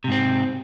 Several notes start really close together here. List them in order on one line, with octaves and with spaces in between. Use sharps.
C3 G#2 C4